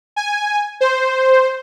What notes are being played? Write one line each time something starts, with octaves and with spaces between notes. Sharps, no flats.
G#5
C5